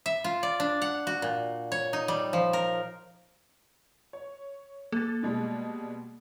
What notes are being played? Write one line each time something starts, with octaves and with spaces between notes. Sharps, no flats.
E5
F4
D5
D4
F#5
F#4
A#2
C#5
D#4
G3
F3
A#4
C#5
A#3 A4 A6
B2 G3 G#3